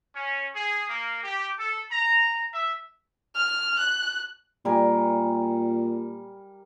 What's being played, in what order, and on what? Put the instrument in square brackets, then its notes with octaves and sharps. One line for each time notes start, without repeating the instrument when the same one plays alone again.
[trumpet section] C#4
G#4
A#3
G4
A4
A#5
E5
[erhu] F6
F#6
[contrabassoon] A#2 [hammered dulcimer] G3 A#4 G#5